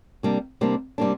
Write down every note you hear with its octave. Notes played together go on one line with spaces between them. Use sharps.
C3 G3 A#3 D4
C3 G3 A#3 D4
C3 G3 A#3 D4